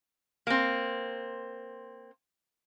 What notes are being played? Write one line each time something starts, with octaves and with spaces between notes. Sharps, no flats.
A#3 C4